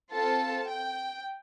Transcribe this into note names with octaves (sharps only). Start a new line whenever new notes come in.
C4 F4 A4 A5
G5